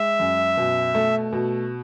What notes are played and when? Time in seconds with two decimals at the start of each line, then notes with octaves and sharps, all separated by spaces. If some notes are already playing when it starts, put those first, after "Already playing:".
Already playing: G#3 E5
0.20 F#2
0.57 B2
0.94 A3
1.33 B2